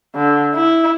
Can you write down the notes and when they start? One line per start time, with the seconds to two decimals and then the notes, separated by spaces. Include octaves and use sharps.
0.15 D3
0.55 E4